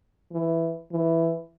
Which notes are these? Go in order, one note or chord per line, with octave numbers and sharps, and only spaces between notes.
E3
E3